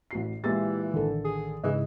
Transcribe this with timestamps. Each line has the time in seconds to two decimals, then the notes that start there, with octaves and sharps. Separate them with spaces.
0.11 A1 F#4 C7
0.44 A#2 E3 G#3 G4 E5 A6
0.94 A1 D3 D#3 A4
1.25 G#4
1.64 G#2 C#3 E3 E4 G#4 D#5